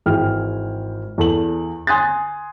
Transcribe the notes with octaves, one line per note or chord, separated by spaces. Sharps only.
G#1 E3 G#4 G5 F6
E2 A4 F#7
G#5 C6 D#6 F#6 A6